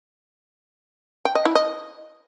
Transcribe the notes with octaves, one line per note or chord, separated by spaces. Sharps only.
G5
D#5
E4
D#5